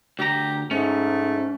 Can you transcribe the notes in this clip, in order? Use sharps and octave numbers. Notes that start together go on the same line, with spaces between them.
D2 G4 A#5
G#2 A3 C#4